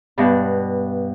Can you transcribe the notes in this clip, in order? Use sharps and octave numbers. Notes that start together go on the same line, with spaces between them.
G2 B2